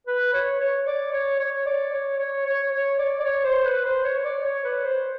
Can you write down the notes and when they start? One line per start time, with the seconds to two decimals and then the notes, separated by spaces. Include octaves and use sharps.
0.07 B4
0.33 C#5
0.60 C#5
0.86 D5
1.12 C#5
1.39 C#5
1.66 D5
1.92 C#5
2.19 C#5
2.45 C#5
2.72 C#5
2.99 D5
3.19 D5
3.24 C#5
3.44 C5
3.64 B4
3.84 C5
4.04 C#5
4.16 C#5
4.24 D5
4.44 C#5
4.64 B4
4.84 C5